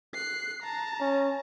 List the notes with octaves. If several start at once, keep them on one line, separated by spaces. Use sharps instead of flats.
F#6 C7
A5 A#5
C#4